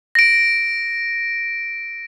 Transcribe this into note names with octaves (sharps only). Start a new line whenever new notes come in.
A#6 D7